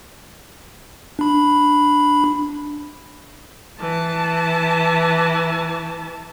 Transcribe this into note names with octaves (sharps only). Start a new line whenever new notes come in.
D4 B5
E3 A5